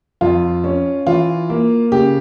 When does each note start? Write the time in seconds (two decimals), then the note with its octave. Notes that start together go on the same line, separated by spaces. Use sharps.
0.21 F2 F4
0.64 C#4
1.07 E3 F4
1.50 A#3
1.92 C#3 G4